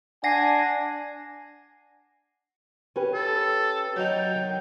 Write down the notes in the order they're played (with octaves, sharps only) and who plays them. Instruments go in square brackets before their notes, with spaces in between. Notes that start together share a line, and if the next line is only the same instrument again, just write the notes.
[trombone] D4 [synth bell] F#5 A#6 C7 [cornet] G#5
[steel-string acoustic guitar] C#4 G4 B4
[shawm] A4
[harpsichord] F#3 D#4 [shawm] G5
[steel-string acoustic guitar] D#3